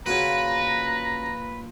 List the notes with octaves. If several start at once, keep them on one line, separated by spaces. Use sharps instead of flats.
A#2 C#3 F4 F#4 B4 A#5